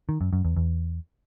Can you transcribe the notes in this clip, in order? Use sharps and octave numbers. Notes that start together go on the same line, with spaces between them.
D#3
F#2
F#2
E2
E2